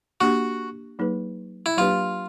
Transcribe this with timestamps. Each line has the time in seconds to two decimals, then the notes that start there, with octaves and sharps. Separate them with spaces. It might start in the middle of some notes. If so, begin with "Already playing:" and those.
0.21 A#3 D4 F#4 G4
0.99 F#3 A#3 D#4 G#4 B4
1.66 E4
1.78 F#3 A#3 D4 F4 G4 B4